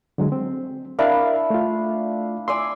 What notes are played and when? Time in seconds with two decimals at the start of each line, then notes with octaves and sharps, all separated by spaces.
0.18 D3 F#3 G#3
0.32 C4
0.99 D4 E4 A#4 D5 E5 F5
1.50 A3 F4
2.48 D5 G#5 C6 E6